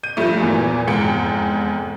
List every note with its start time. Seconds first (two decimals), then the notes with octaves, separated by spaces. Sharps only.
0.03 G6 D#7
0.17 G2 F3 G3 A3
0.40 E2 A#2 E3 F#3
0.87 F1 E2 G#2 G5 C#7